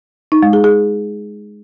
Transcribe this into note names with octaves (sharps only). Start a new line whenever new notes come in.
D#4
G#3
G#4
G#4